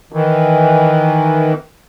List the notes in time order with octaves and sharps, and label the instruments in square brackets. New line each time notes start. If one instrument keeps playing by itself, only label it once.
[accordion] D#3 E3